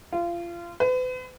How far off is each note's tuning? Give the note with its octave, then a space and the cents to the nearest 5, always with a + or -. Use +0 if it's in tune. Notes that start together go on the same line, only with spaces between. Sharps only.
F4 -25
B4 +40